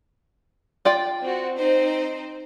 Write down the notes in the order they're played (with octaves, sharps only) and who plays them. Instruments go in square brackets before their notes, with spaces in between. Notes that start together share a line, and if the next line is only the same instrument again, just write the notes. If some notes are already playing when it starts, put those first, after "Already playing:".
[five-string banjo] F4 D5 G5
[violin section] C4 F#4
C4 D#4 C5